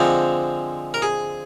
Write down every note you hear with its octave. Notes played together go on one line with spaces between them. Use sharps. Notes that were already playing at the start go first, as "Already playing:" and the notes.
Already playing: D3 F3 G#3 C4
A#4
G#4